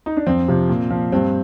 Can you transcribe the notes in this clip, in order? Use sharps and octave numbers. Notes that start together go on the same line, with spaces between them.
D#4
D4
F2 C4
C3 F3
A#2
F3
G2 C4